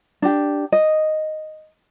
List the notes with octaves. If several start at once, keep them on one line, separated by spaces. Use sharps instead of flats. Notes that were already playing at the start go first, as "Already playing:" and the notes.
D4 G4
D#5